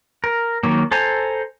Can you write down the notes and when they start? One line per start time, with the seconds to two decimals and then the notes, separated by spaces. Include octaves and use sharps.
0.24 A#4
0.63 D#3 F#3 A#3
0.91 A4 C5 G#5 A#5